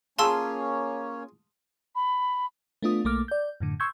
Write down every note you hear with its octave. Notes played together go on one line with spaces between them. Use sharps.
A#3 C#4 F4 G#4 C#5 A5 C6 E6
B5
A3 B3 D4 F4 D#6
B1 A3 A#3 D6 F6
D5 G6
F#2 A2 D3
C6 C#6 E6 G6 G#6